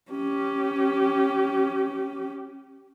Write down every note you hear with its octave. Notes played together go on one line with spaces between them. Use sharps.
C#4 G4